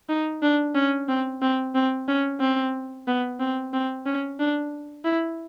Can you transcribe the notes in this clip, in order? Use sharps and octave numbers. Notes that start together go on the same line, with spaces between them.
D#4
D4
C#4
C4
C4
C4
C#4
C4
B3
C4
C4
C#4
D4
E4